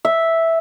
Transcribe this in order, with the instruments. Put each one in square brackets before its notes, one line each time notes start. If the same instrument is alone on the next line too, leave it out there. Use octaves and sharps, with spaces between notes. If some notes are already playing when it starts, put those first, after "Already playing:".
[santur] E5